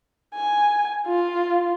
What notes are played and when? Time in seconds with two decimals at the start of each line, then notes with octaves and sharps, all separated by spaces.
0.35 G#5
1.07 F4